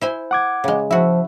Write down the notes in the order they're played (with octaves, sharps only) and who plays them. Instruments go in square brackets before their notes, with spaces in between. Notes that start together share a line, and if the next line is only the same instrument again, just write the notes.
[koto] E4 C5 G#5
[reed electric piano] F#5 D6 G#6
[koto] C#3 G#3
[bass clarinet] F3 [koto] E4 F#4 [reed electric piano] E5